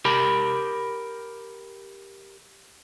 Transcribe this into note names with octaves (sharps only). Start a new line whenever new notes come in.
G4 A#4 B5